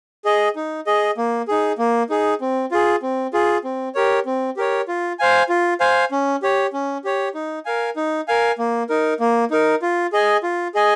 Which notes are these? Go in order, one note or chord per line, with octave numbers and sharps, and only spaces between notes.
G#4 D#5
D#4
G#4 D#5
A#3
D#4 G#4
A#3
D#4 G#4
C4
F4 G#4
C4
F4 G#4
C4
G4 A#4 C#5
C4
G4 A#4 C#5
F4
C5 F5 G#5
F4
C5 F5 G#5
C#4
G4 C#5
C#4
G4 C#5
D#4
A#4 F5 G#5
D#4
A#4 F5 G#5
A#3
D#4 A#4
A#3
D#4 A#4
F4
G#4 D#5 G#5
F4
G#4 D#5 G#5